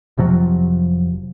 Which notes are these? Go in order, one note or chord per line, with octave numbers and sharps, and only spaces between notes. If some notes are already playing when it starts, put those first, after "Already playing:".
F1 C3 F3 F#3